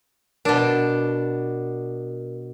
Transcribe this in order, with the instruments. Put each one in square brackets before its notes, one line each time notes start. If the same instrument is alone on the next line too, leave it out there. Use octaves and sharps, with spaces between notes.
[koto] B2 D4 [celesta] A#4